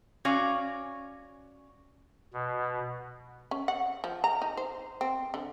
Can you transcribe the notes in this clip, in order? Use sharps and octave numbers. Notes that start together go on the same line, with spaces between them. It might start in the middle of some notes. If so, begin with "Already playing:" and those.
C#4 F#4 C#5 D5 F5 G#5
B2
C#4
F#5
F3
A#5
D#4
C5
C4
D3